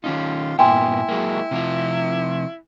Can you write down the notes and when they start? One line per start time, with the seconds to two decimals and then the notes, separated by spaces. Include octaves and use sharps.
0.04 D#3 C#4 D#4 F4
0.59 G2 A#2 B3 E4 G5 G#5 C6
1.09 F#3 G#3 A#3
1.51 C3 F3 F4